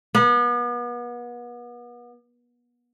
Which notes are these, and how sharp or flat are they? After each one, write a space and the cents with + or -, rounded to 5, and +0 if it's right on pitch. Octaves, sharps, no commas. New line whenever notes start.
B3 -35